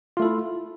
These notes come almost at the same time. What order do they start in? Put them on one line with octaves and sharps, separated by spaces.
F4 A3 A4 E4